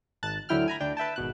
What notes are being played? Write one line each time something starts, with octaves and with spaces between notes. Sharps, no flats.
G#1 A5 F#6 A6
D2 D3 F#3 E4 G5 F6
G#5 A#5 B5
D2 D4 G5
B4 E5 G5 A5
G#1 B2 F#6